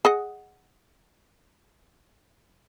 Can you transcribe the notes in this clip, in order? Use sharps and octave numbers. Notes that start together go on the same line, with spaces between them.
G#4 D#5 F#5